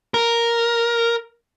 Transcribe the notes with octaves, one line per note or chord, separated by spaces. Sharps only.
A#4